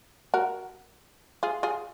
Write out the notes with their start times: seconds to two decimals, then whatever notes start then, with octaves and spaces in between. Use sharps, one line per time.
0.34 F#4 A#4
1.43 F4 G#4
1.63 F4 G#4